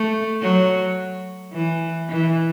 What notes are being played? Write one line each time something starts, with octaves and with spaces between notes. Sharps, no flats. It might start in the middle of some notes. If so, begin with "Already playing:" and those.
Already playing: A3
F#3
E3
E3